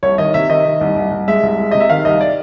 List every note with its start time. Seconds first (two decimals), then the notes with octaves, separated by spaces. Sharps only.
0.03 C2 C#5
0.18 D#3 D#5
0.34 C3 E5
0.50 D#3 D#5
0.65 D#3
0.81 C2
0.96 C2
1.11 C2
1.28 G#3 E5
1.43 C2
1.58 G#3
1.71 C3 D#5
1.80 E5
1.90 D#3 F5
2.05 C2 D#5
2.21 D5